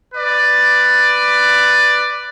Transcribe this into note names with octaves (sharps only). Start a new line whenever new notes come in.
B4 D5